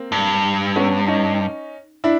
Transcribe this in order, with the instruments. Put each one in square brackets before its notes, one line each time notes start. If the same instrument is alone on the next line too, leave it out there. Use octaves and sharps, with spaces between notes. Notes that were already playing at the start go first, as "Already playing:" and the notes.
Already playing: [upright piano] A#3 C4
[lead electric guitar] G2
[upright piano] B3 C#4
C#4 D#4
D4 E4